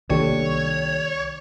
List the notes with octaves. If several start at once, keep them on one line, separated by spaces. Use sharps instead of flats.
C2 D#3 A#3 D4 G4 A4 C#5